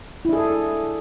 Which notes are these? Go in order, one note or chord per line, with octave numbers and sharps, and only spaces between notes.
D4 E4 G#4 A4